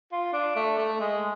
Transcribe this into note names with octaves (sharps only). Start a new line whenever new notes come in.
F4
D4
A3
A3
G#3